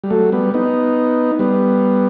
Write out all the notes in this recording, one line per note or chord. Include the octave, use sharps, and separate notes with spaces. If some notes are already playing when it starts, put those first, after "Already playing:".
G3
F#3 A3
G3 B3
B3 D#4
G3 B3